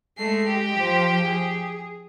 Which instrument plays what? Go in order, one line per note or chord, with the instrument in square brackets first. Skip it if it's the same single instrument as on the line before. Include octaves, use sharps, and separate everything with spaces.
[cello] G#3 [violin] A3 C7
[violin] G4
[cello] F3 C5
G#4